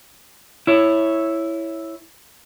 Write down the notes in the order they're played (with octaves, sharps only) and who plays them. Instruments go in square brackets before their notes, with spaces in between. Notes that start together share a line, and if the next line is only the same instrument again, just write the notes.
[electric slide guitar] E4 C#5